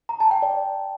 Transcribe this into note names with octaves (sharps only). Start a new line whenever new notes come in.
A#5
A5
G5
D5